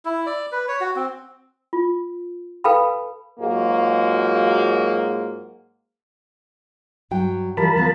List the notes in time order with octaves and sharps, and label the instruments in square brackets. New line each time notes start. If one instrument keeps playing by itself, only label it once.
[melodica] E4
D5
B4
C#5
F#4
C4
[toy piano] F4
A4 B4 F5 G5 A5 B5
[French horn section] G#2 F#3 G#3 A#3 F4 F#4
[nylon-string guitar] G2 F#3 G5
[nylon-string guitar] E3 F3 G3 [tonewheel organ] A#4 A5 B5
[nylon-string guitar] E3 F3 B3